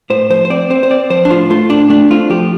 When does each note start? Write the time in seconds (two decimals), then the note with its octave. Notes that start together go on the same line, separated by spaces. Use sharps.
0.10 A2 C5
0.30 F3 C5
0.45 C5
0.50 C4 D5
0.70 C4 C5
0.83 C5
0.90 C4 D5
1.10 F3 C5
1.25 D4
1.30 A2 F4
1.50 A3 F4
1.70 A2 D4
1.90 A3 D4
2.10 C4 F4
2.30 F3 G4